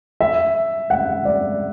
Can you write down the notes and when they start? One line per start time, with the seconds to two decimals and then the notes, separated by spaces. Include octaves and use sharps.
0.20 E5
0.90 F#5
1.25 D5